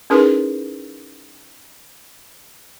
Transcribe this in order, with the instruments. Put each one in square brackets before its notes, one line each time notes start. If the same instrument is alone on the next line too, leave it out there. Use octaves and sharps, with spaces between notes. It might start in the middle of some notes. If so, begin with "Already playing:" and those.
[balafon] C#4 D#4 E4 G#4 A#4 B4